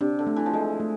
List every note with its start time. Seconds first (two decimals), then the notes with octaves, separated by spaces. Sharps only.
0.01 C3 D4
0.19 D3
0.27 A3
0.36 E3
0.46 F3
0.53 G#3 A4
0.80 A3